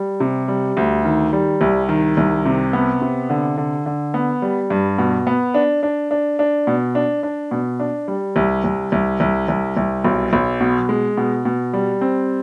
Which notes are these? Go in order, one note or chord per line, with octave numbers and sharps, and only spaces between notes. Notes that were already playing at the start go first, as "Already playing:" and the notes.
Already playing: G3
C3
G3
D2
D#3
G3
C2
D#3
C2
C3
B3
C3
D3
D3
D3
B3
G3
G2
B2
B3
D4
D4
D4
D4
B2
D4
D4
B2
D4
G3
C2
C2
C2
C2
C2
C2
B1
B1
B2
G#3
B2
B2
G3
C4